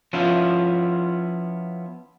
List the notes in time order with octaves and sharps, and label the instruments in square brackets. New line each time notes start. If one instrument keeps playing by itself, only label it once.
[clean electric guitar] F3 B3 C#4 E4 F4 E5